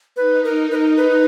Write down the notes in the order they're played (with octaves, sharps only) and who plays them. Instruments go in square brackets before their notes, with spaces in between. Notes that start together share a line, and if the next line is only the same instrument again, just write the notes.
[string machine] D#4 [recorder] B4
[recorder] A#4
B4
A#4
B4